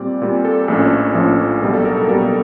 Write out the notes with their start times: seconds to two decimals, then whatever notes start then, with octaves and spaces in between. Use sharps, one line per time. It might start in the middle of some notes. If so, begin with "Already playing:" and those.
Already playing: A#2 G3 C4 D5
0.22 A#2 G3 C4
0.45 A4
0.68 A#1 A2 F3 A#3 C#4 A4
1.15 A#1 A2 F3 A#3 C#4
1.62 B1 B2 G3 A#3 B4
1.73 A4
1.85 A#4
1.97 A4
2.09 B1 B2 G3 A#3 A#4